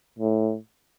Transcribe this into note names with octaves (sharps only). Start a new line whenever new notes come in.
A2